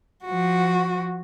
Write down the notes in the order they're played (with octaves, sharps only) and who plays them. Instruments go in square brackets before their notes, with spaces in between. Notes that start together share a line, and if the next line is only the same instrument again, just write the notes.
[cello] F3 F#4